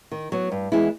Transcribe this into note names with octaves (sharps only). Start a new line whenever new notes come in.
D#3
F#3 B3
G2
E3 G#3 B3 E4